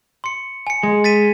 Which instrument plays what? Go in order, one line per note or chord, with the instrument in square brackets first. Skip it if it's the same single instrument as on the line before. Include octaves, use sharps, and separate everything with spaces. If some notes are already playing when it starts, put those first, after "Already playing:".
[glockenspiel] C6 C#7
G#5 C#7
[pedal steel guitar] G#3
[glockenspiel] A6 B6 D#7